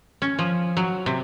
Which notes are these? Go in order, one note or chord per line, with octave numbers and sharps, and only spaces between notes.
C#4
F3
F#3
C3